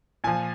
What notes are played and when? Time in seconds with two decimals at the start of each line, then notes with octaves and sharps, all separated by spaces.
0.24 A#2 F3 G#5